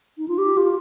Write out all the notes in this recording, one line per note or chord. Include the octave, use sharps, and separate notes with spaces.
D#4
F4
G4
F4